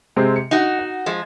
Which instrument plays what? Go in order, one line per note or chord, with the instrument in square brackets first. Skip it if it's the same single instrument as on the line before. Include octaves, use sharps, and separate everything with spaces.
[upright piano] C3 G#3 C4
C#7
[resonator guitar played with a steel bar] D#4 F#4
[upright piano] F#5
[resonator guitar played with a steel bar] F3 G#3